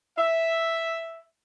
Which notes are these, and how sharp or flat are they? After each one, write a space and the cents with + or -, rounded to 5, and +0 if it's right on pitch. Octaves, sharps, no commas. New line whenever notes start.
E5 +0